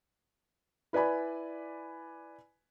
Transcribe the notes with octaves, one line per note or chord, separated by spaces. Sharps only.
E4 B4 D5 G#5 B5